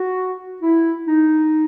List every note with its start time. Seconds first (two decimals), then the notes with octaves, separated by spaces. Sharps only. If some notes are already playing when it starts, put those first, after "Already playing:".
Already playing: F#4
0.61 E4
1.07 D#4